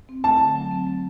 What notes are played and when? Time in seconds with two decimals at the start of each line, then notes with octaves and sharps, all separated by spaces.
0.09 C4
0.24 A3 A5
0.40 D3
0.55 F#3
0.71 C4
0.87 A3